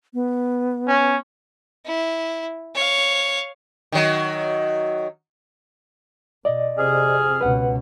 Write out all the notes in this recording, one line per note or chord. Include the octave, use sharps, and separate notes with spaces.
B3
C#4
E4
C#5 F5
D#3 F#3
B2 D5 D#5
F2 C3 C4 G#4 F6
C#2 B2 B4 F#5